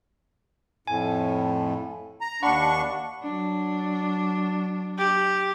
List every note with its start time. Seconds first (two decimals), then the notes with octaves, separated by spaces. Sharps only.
0.87 F2 A2 G#5
2.21 A#5
2.43 D#2 D4 F#5 B5 C#6
3.23 F#3 D4
4.99 G4